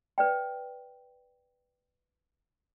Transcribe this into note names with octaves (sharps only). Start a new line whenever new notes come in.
B4 D5 G5